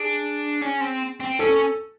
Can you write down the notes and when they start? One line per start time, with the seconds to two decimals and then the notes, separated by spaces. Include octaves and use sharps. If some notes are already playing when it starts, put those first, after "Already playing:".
Already playing: D4 G#4
0.62 C#4
0.81 C4
1.20 C4
1.39 C#4 A4